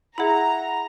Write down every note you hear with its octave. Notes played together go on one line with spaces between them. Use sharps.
E4 G#4 E5 F#5 A#5 B5